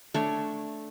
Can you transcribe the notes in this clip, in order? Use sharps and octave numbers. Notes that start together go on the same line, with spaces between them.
A3 D4 C#5